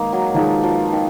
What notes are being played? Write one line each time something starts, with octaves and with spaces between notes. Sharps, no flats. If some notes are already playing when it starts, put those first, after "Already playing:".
Already playing: D#3 G#3 A#3 D#4
F#3
D#3 F3 G#3 D#4
F3
D#3